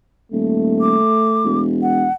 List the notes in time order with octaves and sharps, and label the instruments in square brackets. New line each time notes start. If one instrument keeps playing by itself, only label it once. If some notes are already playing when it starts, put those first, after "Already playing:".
[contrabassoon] D#1 [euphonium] A3
[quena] D6
[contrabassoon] E1
[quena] F#5